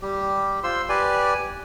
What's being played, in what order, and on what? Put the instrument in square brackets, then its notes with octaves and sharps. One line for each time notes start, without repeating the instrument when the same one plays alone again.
[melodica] G3 G4
F4 C5 C6 E6
G4 B4 D5 G#5